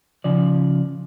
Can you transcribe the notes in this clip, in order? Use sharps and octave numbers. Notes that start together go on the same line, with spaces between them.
C#3 F3 D5